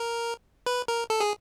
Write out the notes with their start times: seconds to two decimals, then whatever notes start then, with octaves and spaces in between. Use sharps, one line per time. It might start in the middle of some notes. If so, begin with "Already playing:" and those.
Already playing: A#4
0.66 B4
0.88 A#4
1.10 A4
1.20 G#4